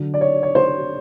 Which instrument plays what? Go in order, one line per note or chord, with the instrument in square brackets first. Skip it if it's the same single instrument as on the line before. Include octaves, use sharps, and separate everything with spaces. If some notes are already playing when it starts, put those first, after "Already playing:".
Already playing: [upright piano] D3 F#3
D5
C#5
C#5
C5